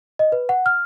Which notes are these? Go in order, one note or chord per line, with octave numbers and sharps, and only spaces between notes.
D#5
B4
F#5
F6